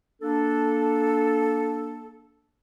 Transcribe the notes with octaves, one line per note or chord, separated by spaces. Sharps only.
A#3 D4 A4